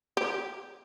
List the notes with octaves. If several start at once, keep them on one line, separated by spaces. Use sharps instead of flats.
G4